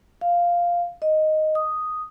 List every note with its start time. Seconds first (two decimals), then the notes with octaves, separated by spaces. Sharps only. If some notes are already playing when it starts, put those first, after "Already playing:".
0.21 F5
1.02 D#5
1.55 D#6